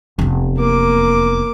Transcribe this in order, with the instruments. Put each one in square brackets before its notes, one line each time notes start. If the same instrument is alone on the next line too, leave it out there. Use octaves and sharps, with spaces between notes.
[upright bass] F1 E2
[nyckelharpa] A#3 D6